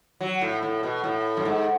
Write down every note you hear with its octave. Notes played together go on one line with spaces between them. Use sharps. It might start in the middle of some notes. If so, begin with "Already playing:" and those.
F#3
A2
A2
B2
A2
F#2
G#2